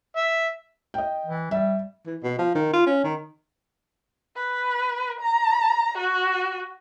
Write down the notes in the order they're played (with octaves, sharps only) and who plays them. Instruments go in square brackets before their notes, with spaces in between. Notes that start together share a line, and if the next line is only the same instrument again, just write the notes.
[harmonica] E5
[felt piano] D#5 G5
[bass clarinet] E3
[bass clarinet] G3 [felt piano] E5
[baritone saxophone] E3
B2
F3
D#3
F4
C#4
D#3
[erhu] B4
A#5
F#4